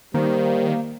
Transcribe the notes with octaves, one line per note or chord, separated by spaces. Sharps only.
D#3 G3 A#3 C5